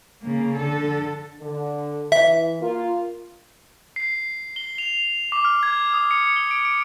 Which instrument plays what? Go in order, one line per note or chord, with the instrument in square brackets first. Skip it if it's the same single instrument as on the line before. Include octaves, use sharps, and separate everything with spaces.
[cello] C#3 A#3
D3 A4
[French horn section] D3
[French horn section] E3 [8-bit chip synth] E5
[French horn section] A#3 F4
[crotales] C7
G7
F7
D6
F6
G#6
D#6
C#7
G7
D7
D7